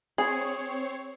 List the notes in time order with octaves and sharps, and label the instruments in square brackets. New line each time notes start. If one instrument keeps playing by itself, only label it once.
[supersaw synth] C4 C#5 C7 [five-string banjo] G#4